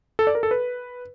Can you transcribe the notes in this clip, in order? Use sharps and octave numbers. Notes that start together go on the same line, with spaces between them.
A4
D5
A#4
A4
B4